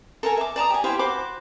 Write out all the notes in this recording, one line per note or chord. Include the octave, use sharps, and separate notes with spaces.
A4 A#4 G#5
E5 D6
D5 A5 A#5 D#6
G4 G#5
E4 G4 C5 F5
F#4 C5 B5 D6